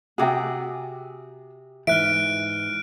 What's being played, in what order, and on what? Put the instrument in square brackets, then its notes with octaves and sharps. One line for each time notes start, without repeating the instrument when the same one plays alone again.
[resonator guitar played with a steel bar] C3 G#4 [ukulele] F#4 G5
[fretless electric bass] G#2 E3 [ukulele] E5 [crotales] F6 F#6 D7